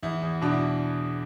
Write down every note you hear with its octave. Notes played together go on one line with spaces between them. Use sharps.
E2 E4
E2
B2 D4
E4